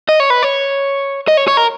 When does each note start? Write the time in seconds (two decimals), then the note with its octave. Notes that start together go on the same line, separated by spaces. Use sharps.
0.09 D#5
0.20 C#5
0.30 B4
0.43 C#5
1.28 D#5
1.37 C#5
1.48 C#5
1.57 A#4